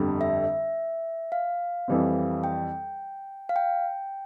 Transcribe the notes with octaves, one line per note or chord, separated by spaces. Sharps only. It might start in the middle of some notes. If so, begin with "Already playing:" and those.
Already playing: G1 F2 D3 G3
E5
F5
F2 E3 G3 C4
G5
F5
G5